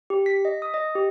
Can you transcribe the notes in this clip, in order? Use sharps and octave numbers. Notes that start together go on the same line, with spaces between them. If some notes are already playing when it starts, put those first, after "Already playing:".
G4
B6
D#5
D#6
D#5
G4